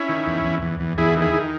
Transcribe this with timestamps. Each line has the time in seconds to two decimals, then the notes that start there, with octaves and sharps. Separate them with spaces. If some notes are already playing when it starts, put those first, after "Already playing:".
Already playing: C#4 E4
0.09 D#3
0.27 E2
0.44 E2
0.62 E2
0.80 E2
0.98 E2 E4 G#4
1.16 D#3
1.22 E4 G#4
1.34 D#3